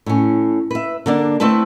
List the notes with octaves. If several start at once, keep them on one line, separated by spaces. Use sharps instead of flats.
A2 C#4
B4 E5
D3 A#3 D4
A3 C4 E4 B4 A5